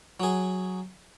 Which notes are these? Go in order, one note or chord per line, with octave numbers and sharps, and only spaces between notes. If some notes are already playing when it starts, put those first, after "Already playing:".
F#3 G#4